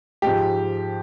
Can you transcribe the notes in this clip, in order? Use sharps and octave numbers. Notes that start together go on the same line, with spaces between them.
G#2 F3 G#3 G4